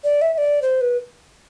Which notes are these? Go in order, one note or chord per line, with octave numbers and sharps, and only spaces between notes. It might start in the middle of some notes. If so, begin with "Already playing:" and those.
D5
E5
E5
D5
C5
B4